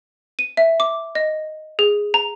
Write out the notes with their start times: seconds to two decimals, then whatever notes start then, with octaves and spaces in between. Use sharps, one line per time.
0.39 D#7
0.57 E5
0.80 D6
1.15 D#5
1.79 G#4
2.14 A#5